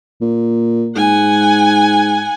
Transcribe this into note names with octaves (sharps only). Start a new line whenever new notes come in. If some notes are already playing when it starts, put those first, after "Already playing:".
A#2
G#2 F#5 G#5